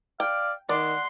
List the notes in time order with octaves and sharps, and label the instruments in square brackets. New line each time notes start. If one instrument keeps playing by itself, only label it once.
[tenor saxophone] D5 [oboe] F5 [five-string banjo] G5
[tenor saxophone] D#3 [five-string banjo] D5 [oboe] F#5 [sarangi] C6